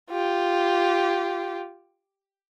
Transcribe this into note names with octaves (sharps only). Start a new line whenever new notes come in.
F4 G4